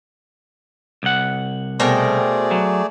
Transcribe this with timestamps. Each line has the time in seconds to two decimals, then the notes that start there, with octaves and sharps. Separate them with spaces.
1.03 C2 F#5
1.80 B2 A3 G#4 A#4 C5 D5 G5
2.51 F#3